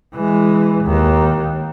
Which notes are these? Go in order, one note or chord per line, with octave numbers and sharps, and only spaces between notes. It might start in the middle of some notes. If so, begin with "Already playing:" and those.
E3 G#3
D#2